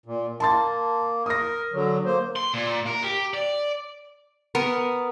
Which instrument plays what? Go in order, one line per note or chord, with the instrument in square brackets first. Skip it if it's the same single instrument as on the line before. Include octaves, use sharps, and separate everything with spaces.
[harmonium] A#2
[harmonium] A#3 [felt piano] A5 C6 A6
[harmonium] A#4 [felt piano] D#6 A#6
[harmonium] D3 F#3
A#3 C5
[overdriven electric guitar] C6
A#2
A#4
G4
D5
[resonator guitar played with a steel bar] B3 A#4